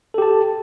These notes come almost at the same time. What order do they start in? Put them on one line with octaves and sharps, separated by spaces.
A4 G4 A5